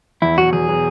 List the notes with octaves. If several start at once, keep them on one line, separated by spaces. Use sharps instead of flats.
E2 E4
B2 F#3 F#4
E2 G#4
B2 F#3